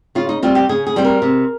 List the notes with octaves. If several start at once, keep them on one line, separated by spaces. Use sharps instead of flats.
C#3 F4
D#4
G3 C4 F4
G4
C#3 G#4
G#4
G3 C4 C5
A#4
C3